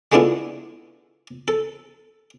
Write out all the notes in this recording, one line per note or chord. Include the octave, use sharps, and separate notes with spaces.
G#3 A3 B3 D4 E4 F4
A4